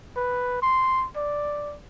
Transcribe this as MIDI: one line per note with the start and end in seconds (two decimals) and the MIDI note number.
0.16 0.59 71
0.62 1.06 84
1.16 1.75 74